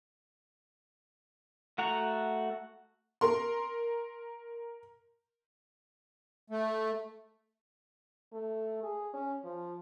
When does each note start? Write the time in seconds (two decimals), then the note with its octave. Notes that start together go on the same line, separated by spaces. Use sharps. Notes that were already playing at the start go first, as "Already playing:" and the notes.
1.78 A3 F#4 F#5 A#5 C#6
3.21 A#4 C6
6.50 A3
8.33 A3
8.83 G#4
9.13 C#4
9.44 F3